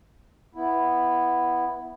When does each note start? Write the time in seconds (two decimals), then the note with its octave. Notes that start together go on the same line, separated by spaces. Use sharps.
0.55 B3 E4